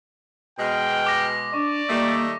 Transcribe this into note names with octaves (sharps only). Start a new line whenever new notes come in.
B2 G#3 G5 F6
D6 A#6
D4 D5 C#6
D#3 G3 A3 A#3